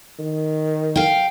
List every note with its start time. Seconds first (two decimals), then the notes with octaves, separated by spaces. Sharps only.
0.19 D#3
0.96 F5 G5